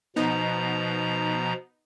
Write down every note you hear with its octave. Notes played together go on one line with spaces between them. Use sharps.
B2 F3 B3 D#4 A#5